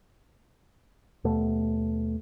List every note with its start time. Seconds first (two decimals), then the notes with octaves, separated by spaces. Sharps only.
1.24 D#2 B2 A3